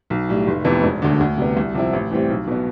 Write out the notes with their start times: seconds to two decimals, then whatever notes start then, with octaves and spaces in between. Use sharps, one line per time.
0.10 B1
0.29 A2 G3
0.47 F1
0.65 F2 C3 E3 B3
0.83 E1
1.02 D2 D3
1.20 D2
1.38 C3 G3 B3
1.57 C2
1.74 C3 F3 C4 E4
1.93 A1
2.11 A2 E3 G3 C4
2.29 B1
2.47 B2 B3